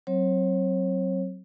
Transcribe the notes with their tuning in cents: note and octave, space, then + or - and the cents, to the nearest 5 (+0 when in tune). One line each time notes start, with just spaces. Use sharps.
F#3 +10 C4 +10 C#5 -40